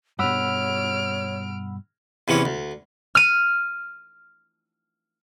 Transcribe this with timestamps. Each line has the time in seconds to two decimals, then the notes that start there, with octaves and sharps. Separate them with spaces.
0.19 G2 B2 C#5 F#5 B5 E6 F6 D7
2.28 E2 C3 E3 C#4
2.45 D2
3.15 F6 D#7